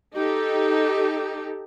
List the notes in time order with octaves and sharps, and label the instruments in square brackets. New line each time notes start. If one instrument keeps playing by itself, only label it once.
[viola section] D#4 G4 A4